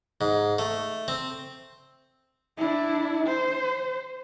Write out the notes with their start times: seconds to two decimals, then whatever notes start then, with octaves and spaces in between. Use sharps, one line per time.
0.21 G#2
0.59 A3
1.08 C4
2.57 D4 E4
3.27 C5